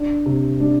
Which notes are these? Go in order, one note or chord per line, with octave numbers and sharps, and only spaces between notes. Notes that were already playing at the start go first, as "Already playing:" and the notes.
Already playing: D4
C3
D4